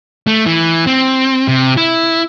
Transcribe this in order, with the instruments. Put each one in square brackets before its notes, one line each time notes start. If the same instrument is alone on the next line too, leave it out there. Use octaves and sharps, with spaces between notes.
[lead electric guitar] A3
E3
C4
C3
E4